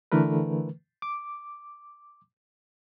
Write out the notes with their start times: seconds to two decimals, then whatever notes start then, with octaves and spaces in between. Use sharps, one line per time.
0.12 D3 E3 A3 A#4 B4
1.02 D6